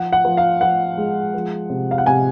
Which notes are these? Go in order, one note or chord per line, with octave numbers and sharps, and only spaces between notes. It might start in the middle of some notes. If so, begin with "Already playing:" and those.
Already playing: F3 F#5
F#5
F3
F5
F3 F#5
G#3
F3
C3
F5
F#5
C3 G#5